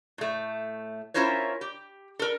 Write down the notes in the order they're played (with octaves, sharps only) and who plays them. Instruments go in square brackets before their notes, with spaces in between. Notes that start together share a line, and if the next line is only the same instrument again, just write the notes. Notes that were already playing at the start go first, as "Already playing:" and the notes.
[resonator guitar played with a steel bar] A2 A3
C#4 E4 F4 A#4 C5 C#5
G4
A4 A#4